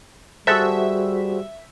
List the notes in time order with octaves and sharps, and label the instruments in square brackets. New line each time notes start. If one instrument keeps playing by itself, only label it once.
[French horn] G3 [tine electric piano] F#4 G#4 C5 [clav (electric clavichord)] A4 F#5 A5 [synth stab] E5